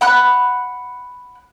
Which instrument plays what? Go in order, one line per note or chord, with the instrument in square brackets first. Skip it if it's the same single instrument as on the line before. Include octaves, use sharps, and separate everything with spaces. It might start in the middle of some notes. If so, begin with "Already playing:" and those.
[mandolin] F#5 B5 F#6